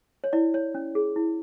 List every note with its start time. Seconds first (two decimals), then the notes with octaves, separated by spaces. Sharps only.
0.24 C#5
0.33 E4 D5
0.54 C#5
0.75 C#4
0.95 G#4
1.16 E4